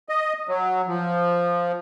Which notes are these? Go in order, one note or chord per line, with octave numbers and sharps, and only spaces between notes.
D#5
F#3
F3